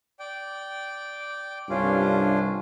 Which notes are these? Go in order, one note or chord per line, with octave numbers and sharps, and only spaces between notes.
D5 G5
C2 G2 C#4 D4 F4